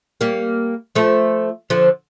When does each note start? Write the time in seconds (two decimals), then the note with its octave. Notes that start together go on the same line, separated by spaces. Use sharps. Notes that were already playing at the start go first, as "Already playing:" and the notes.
0.21 G3 A#3
0.95 F3 A3
1.70 D3 F3